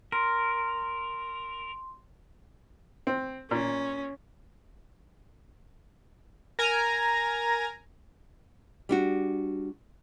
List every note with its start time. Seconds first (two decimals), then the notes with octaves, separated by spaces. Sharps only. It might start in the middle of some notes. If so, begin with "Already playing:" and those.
0.12 A#4 C6
3.07 C4
3.51 A#2 C#4
6.59 A#4 G#5 A#5
8.89 G3 D4 F#4